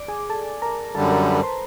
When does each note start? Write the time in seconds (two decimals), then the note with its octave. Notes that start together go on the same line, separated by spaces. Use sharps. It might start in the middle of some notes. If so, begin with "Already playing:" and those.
Already playing: D5 D6
0.08 G#4 G#5
0.30 A4 A5
0.62 A#4 A#5
0.95 F#2 D3 G3 A4 A5
1.11 A#4 A#5
1.28 B4 B5
1.43 C5 C6